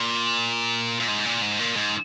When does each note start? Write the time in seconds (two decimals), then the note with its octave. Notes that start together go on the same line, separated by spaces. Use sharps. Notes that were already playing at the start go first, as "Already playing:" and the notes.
Already playing: A#2
1.00 A#2
1.08 G#2
1.25 A#2
1.42 G#2
1.59 A#2
1.76 G#2